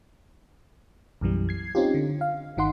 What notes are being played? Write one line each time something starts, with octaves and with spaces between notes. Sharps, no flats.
B1 F#2 B2 E3 G3
G#6 C7
C4 C#4 D#4 F4 G4
D3
F5
G1 D#3 D#4 F#5 C6